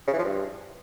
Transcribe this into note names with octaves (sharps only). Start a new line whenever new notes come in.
C#3
E3
F3
G2